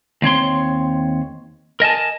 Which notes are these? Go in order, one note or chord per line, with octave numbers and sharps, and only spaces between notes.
D#2 C4 C#5 C6
A#4 D#5 G#5 A5